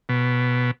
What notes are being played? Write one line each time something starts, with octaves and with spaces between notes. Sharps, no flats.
B2